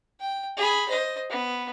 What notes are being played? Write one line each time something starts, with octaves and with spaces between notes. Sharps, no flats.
G5
G#4 B5
C5 D#5
B3